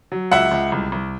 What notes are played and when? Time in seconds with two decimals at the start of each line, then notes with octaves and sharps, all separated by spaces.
0.12 F#3
0.31 C#2 E5 F#5
0.51 C#2
0.72 C2
0.92 C2